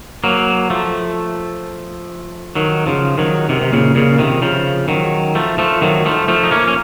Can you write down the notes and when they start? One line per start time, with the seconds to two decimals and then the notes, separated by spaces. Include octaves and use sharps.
0.24 F#3 A#3
0.70 F3 A3
2.55 D#3 F#3
2.86 C#3 F3
3.18 D#3 F#3
3.49 C3 D#3
3.62 C3
3.72 A#2 C#3
3.95 A#2 C#3
4.18 C3 D#3
4.42 C#3 F3
4.88 D#3 F#3
5.35 F3 A3
5.58 F3 A3
5.81 D#3 F#3
6.05 F3 A3
6.28 F3 A3
6.44 D#4
6.51 A#3 C#4
6.68 C#4